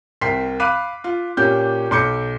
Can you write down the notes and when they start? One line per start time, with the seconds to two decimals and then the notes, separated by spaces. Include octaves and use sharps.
0.21 C2 A#4 G5 C6 B6 C7
0.60 F5 B5 D6 F#6 B6 D#7
1.04 F4
1.37 A#2 A#3 C#4 G4 G6
1.91 B1 C6 D6 G6 C#7